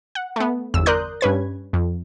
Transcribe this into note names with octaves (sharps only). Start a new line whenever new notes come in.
F#5
A3 B3
G1 E2 E6
A#4 D5 C6 D#6 F#6 G6
G2 C#4 B4 G#6
F2